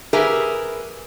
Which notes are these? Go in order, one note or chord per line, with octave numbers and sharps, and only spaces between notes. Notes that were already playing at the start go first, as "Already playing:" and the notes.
G4 G#4 A#4 B4 E5